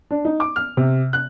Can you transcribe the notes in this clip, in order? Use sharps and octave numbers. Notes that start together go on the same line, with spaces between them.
D4
D#4
D6
F6
C3
F#6